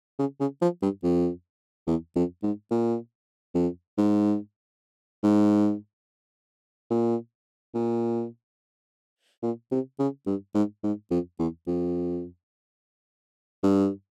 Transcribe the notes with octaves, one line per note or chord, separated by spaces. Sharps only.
C#3
C#3
F3
G2
F2
E2
F2
G#2
A#2
F2
G#2
G#2
A#2
A#2
A#2
C3
C#3
G2
G#2
G#2
F2
E2
F2
G2